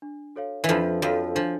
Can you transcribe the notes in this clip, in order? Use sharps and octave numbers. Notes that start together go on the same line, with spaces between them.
D4
F#4 A4 C#5 F5
E3
F2 F3 D4
F2 F3 F#4 A4 C#5 F5
F3 D4